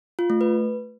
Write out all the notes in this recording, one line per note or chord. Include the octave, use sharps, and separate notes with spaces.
F4
A3
B4